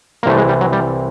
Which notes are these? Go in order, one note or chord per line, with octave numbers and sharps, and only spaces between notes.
A#3
C2 C3 E3 A3
G#3
G3
F#3
G3